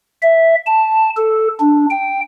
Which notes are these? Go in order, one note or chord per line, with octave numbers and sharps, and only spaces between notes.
E5
A5
A4
D4
G5